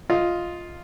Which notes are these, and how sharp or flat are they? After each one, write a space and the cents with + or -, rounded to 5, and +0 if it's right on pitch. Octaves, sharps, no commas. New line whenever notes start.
F4 +0 D#5 +10